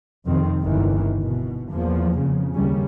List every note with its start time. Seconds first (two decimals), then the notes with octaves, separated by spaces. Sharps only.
0.26 F2 C3 D#3 C4
0.61 G1 C#2 D#3 E3
1.22 B2
1.71 E2 F3 A#3
2.17 F2 C#3
2.54 D#2 C#3 G3 C#4